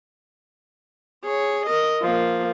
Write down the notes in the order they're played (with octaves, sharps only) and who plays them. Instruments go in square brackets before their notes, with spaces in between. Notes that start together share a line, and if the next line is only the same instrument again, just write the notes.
[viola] G#4 C#5
A#4 D#5
F3 A#3